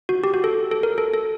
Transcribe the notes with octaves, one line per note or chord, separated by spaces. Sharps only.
F#4
G4
F#4
A4
A4
A#4
A4
A4